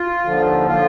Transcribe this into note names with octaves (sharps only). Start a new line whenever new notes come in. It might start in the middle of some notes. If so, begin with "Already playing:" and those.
Already playing: F4
D#2 D3 F3
D3 F3 F4